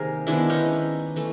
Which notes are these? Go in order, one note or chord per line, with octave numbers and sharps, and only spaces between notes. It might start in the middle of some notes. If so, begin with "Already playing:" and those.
Already playing: C3 D#3 G3 A#3 G#4 A#4
D#3 G#3 B3 D4 E4
C#4 D#4
E3 A3